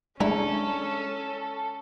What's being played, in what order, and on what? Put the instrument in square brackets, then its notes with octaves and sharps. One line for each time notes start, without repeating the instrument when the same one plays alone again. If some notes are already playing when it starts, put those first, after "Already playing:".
[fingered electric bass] G#3 [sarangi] C#4 [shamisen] D4 E4 A#5 [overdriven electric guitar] A4